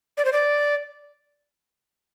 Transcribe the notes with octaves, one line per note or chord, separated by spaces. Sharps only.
D5
C5
D5